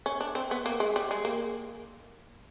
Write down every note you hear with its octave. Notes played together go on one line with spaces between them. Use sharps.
C#4
D4
C4
B3
A#3
G#3
G3
G#3
A#3